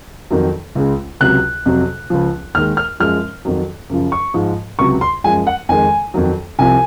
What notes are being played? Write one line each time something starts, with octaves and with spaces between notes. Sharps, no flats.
F2 D#3 F#3
C#2 C#3 G#3
C#2 C3 F#3 F#6
F2 C3 F#3
C#2 C#3 F3
D#2 D#3 G#3 F6
F6
F#2 F3 G#3 F6
F2 D#3 F#3
F#2 C#3 F3
C#6
G#2 F3 G#3
C#2 C3 F#3 C#6
C6
F#2 F3 G#3 G#5
F#5
F2 D#3 G#3 G#5
F2 D#3 F#3
C2 C3 F3 G#5